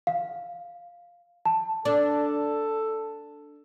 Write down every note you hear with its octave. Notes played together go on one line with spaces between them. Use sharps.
F5
A5
D4 A4